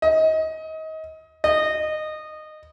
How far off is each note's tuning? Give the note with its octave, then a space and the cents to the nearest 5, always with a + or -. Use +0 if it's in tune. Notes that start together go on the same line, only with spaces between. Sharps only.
D#5 +30
D#5 -15